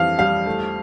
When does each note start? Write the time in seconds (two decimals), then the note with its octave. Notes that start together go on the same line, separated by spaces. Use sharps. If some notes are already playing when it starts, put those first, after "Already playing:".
Already playing: F2 E3 G3 F5
0.19 G3 F5
0.46 A3